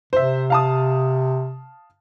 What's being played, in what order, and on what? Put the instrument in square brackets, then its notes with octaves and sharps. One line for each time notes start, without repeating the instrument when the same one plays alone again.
[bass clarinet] C3 [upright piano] C5 E5
[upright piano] F5 A5 D#6